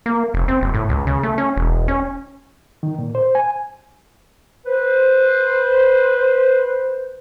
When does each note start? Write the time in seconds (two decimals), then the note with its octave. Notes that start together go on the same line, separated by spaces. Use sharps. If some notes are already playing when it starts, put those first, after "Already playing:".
0.06 A#3
0.34 F1
0.48 C4
0.61 F#1
0.74 A2
0.89 C#2
1.07 C#3
1.23 A3
1.38 C#4
1.57 E1
1.88 C#4
2.83 D#3
2.99 A#2
3.15 C5
3.35 G#5
4.66 B4 C5